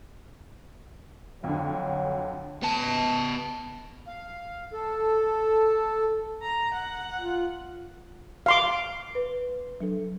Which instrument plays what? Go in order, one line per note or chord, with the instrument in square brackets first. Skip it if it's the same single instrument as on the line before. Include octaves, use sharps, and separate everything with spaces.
[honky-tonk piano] F2 D3 [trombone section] F#3
[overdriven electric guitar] B3 A5
[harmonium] F5
A4
[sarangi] A#5
F#5
[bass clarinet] F4
[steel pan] F5 C6 D6
[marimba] B4
F#3 D4 A4